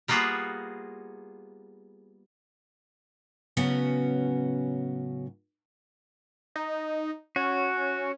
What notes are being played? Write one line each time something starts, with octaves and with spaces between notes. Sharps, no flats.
G3 A#3 B3 F4 F#4 G#4
A2 C#3 F#3 B3 C#4 F#4
D#4
C#4 F#4